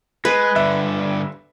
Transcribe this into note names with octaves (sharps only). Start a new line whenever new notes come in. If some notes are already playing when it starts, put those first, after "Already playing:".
G#3 B4
G2 D3 E5